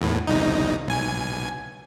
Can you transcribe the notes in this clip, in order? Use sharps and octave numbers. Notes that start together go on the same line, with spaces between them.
E2 A2
G1 C2 D#4
B1 G#5